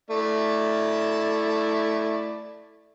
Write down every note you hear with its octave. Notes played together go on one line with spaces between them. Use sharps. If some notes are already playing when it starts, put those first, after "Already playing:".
A3 E4 D5